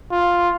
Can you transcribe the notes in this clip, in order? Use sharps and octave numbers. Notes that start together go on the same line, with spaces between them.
F4